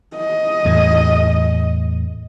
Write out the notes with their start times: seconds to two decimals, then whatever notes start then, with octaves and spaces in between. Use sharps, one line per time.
0.17 D#5
0.65 E2 A2